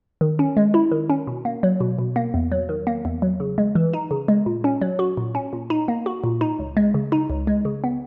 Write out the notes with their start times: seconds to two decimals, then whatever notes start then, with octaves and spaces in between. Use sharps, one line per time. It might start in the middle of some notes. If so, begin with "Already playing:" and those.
0.21 D#3
0.39 C#4
0.57 G#3
0.74 E4
0.92 D#3
1.10 C#4
1.27 B2
1.45 A#3
1.63 F#3
1.81 B2
1.99 B2
2.16 A#3
2.34 E2
2.52 F#3
2.69 D#3
2.87 A#3
3.05 E2
3.22 F#3
3.40 C#3
3.58 G#3
3.75 E3
3.93 D#4
4.11 C#3
4.28 G#3
4.46 A#2
4.64 C#4
4.81 F#3
4.99 F#4
5.17 A#2
5.35 C#4
5.53 A#2
5.70 D#4
5.88 A#3
6.06 F#4
6.24 A#2
6.41 D#4
6.59 C#2
6.77 G#3
6.94 C#3
7.12 D#4
7.30 C#2
7.47 G#3
7.65 C#3
7.84 B3